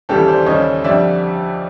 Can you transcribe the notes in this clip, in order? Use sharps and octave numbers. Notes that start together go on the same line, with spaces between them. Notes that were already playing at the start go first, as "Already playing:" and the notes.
D#2 C#3 E3 G3 G4 A4
C5 D5
D#2 C#3 E3 G3 C#5 D#5
F2 D3 G3 D5 E5